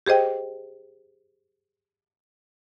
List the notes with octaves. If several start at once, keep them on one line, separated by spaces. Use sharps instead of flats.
G4 G#4 C5 D#5 G5